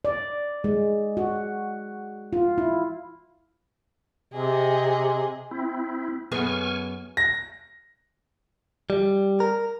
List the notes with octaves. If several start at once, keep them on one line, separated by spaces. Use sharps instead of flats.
D5
G#3
F#4
F4
E4
C3 G#4 D#5
C4 E4
F#2 B3 G#4 G#5 C#6 F6
A#6
G3
A#4